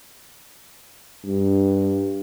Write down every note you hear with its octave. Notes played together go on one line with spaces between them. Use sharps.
G2